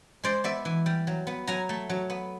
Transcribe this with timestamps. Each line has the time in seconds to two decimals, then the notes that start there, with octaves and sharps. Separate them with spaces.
0.24 G#3 C5 D5
0.44 B3 D5 E5
0.65 E3
0.86 G3
1.07 F#3
1.27 B3
1.47 F#3 G#5 A#5
1.69 A3
1.90 F#3
2.10 B3